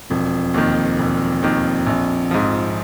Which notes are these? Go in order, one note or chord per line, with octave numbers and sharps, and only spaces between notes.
E1 F2
D#2 D#3
E1
D#2 D#3
A#1
G#2 F3